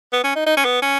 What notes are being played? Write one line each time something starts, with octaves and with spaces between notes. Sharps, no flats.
B3
C#4
D#4
D#4
C#4
B3
C#4